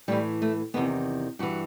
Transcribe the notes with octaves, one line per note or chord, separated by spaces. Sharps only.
A2 E3 G3
A3
E2 C3 D#3 B3
G2 E3 F#4